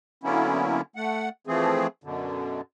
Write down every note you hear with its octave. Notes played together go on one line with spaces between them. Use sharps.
D3 F#3 A#3 B3 C#4 E4
A3 F#5
E3 F3 A3 C4 G#4
F#2 B2 D3